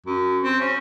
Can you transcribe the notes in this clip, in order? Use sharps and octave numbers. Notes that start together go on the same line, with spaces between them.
F#2
C4
C#4